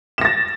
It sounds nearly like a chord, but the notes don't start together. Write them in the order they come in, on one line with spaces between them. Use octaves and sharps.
E7 A#6 A6